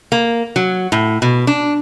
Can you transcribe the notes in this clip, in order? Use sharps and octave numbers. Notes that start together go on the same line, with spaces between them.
A#3
F#3
A2
B2
D4